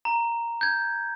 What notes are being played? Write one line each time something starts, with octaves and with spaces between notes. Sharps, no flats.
A#5
G6 G#6